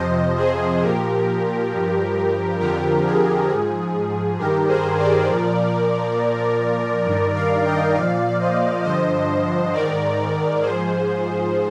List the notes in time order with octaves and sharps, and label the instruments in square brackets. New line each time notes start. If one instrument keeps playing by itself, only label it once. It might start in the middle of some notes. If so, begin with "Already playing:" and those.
Already playing: [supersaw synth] F2 C3 F3 C5 D#5
G#4 C5
A#2 F3 G4 A#4
G2 F3
F2 D3 F3 G4 A#4
G#4
G#2 F3 G#4
G2 D#3 G4 A#4
G#4 C5
A#4 D5
A#2 F3
A#2 F3
G2 D#3
D5 F5
D#5 G5
A#2 F3 D5 F5
C5 D#5
G2 D3 F3 C5 D#5
G#2 D#3 A#4 D5
G#2 F3 G#4 C5